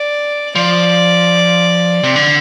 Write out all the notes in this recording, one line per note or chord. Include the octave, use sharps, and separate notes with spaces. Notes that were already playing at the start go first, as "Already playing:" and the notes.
Already playing: D5
F3 D5
C3
D3